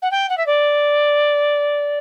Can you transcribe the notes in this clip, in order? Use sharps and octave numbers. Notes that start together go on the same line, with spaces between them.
F#5
G5
F#5
E5
D5